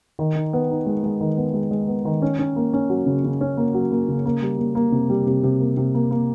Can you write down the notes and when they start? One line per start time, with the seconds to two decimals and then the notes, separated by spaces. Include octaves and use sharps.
0.19 D#3
0.36 D#4
0.53 B3
0.71 D#4
0.86 G#3
1.03 G#3
1.21 D#3
1.37 B3
1.54 G#3
1.71 G#3
1.88 B3
2.05 D#3
2.22 C#4
2.39 C#4
2.56 A#3
2.73 C#4
2.90 F#3
3.06 C#3
3.24 C#3
3.41 C#4
3.57 A#3
3.74 F#3
3.92 A#3
4.09 C#3
4.26 A#3
4.42 G3
4.59 A#3
4.75 A#3
4.92 C3
5.09 G3
5.26 C3
5.43 C3
5.60 A#3
5.77 C3
5.95 A#3
6.11 A#3